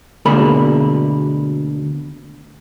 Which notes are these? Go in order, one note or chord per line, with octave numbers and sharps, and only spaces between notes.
D2 B2 D3 G#3 A#3 B5